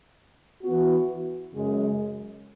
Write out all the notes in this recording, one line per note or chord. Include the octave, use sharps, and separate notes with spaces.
E3 B3 F#4
F#2 C#3 G#3